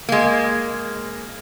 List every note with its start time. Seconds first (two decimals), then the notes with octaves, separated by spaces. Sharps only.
0.09 G#3 A#3